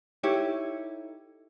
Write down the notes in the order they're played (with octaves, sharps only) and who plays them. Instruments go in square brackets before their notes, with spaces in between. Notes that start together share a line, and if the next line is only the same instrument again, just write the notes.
[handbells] D#4 A4 [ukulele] E4 G4 C#5